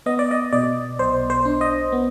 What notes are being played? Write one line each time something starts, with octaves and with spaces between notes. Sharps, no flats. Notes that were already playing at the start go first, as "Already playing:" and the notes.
B3 D#5
D5
D#5
B2 D5
B1 C5
C5
D4
D#5
B3